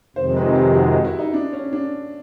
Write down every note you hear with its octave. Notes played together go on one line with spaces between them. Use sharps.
F2 C3 D#3 G#3 C5
B4
G4
F#4
E4
D#4
D4
C#4
D4